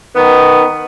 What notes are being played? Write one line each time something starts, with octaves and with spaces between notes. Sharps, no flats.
D#3 B3